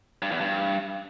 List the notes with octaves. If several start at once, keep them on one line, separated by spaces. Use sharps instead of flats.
G2
E2
G2